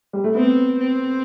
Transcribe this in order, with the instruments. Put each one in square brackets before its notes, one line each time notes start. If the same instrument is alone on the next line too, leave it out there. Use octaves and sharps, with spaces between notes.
[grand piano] G3
A3
[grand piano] B3 [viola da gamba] C4
[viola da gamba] C4